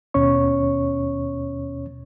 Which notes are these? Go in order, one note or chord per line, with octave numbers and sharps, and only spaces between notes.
D#2 B2 C#4 C#5 C#6